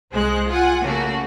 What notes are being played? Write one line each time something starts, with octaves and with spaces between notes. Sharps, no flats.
C2 G#3 C5 F#6
F4 F#5 G#5
C#3 A3 A#3 F#4